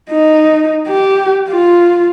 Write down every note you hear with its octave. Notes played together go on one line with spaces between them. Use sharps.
D#4
G4
F4